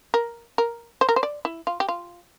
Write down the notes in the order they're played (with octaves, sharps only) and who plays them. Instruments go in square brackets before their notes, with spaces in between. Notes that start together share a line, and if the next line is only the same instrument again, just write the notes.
[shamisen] A#4
A#4
C5
A#4
C5
D5
E4
F4
G4
F4